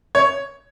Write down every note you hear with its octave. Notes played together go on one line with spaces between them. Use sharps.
C#5